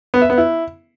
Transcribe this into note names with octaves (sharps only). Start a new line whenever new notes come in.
B3
E5
B3
E4